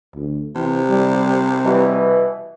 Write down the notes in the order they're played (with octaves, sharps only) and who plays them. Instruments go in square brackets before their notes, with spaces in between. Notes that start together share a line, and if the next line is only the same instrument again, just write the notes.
[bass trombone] D2
[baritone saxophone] C3 [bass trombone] E3
[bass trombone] G3
[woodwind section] B2 E3 [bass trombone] G3